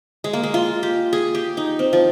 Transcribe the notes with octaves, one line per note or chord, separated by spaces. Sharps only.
G#3
A#3
G#3
F4
G4
G#4
G4
D#4
C4
F3